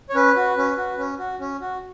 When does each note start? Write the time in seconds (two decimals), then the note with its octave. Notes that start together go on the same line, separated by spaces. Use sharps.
0.09 C#5
0.14 C#4 B4
0.36 F#4
0.57 C#4
0.77 F#4
0.98 C#4
1.19 F#4
1.40 C#4
1.61 F#4